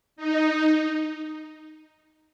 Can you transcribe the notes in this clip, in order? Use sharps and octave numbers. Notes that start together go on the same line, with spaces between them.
D#4